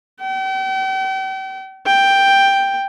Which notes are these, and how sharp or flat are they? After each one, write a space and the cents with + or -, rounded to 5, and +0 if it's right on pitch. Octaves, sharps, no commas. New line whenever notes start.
G5 -40
G5 +5